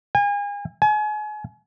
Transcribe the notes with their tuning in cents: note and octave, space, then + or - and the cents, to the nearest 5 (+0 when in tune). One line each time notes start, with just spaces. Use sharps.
G#5 -35
G#5 +35